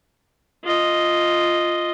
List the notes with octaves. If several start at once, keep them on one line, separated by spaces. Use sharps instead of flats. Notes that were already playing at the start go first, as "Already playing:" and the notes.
F4 D#5